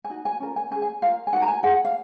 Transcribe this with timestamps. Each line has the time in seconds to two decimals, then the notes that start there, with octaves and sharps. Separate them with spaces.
0.04 G#5
0.10 D#4 F#4
0.25 G#5
0.40 C#4 F4 A#4
0.56 G#5
0.71 C#4 G#5
0.75 G#4
0.82 G#5
1.02 F4 A#4 F5
1.27 G#5
1.33 D#4 F#4 A#4 F#5
1.42 A#5
1.48 G#5
1.63 F4 G#4 F#5
1.85 F5